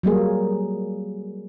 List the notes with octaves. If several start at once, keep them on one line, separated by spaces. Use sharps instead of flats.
F#3 G3 A#3 G#4